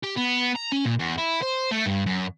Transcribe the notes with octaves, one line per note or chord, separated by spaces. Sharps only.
G4
B3
A#5
C#4
A#2
E2
E4
C5
A3
G2
F#2